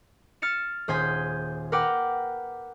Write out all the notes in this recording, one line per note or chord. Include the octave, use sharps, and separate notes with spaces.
F6 A6 C#7 E7
D#1 G#4 C5 G#5 G6 B6
A#4 B4 F#5 G5 D6